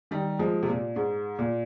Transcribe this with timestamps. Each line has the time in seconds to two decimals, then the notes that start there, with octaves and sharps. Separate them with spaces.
0.11 D#3 G3
0.39 F3 G#3
0.63 C3
0.68 A#2
0.96 G#2
1.39 A#2